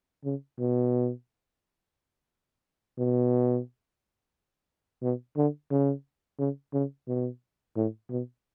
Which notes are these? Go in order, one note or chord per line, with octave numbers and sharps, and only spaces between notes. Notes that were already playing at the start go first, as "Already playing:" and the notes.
C#3
B2
B2
B2
D3
C#3
C#3
C#3
B2
A2
B2